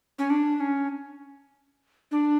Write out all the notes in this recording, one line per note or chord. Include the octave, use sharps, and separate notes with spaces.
C#4
D4
C#4
D4